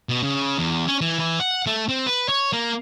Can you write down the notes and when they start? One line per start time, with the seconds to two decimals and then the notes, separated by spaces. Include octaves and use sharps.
0.09 B2
0.23 C#3
0.58 E2
0.88 C#4
1.01 E3
1.19 E3
1.40 F#5
1.67 A3
1.89 C4
2.07 B4
2.29 C#5
2.53 A#3